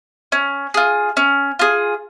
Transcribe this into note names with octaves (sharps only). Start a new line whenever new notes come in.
C#4
F4 G#4
C#4
F4 G#4